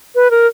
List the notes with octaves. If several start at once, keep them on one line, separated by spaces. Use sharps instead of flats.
B4
A#4